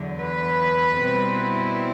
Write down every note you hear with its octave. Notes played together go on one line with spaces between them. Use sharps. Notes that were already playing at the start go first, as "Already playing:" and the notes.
Already playing: E2 D3 F#3
B4
B2 G3 C4 E4